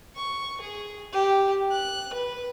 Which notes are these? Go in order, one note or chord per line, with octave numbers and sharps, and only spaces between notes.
C#6
G#4
G4
F#6
B4